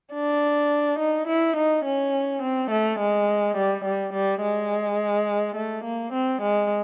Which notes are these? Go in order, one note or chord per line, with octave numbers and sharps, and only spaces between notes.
D4
D#4
E4
D#4
C#4
C4
A3
G#3
G3
G3
G3
G#3
A3
A#3
C4
G#3